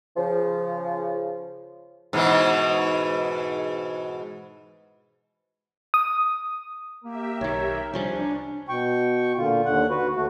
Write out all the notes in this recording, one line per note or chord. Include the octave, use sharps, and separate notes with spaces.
C#3 F3
G#2 B2 E3
D#6
A#3 G4 A#4 E5
B1 D#3 C#5
C2 F3 G3 C#4 D4 C5
B2 G5 C#6
A#2 D3 F4
D#2 D3 F#5
F#4 B4
D#2 A3 F#4